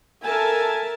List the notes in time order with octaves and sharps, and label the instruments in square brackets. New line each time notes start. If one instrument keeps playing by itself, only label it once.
[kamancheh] A4 G#5 [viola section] A#4 E5 A5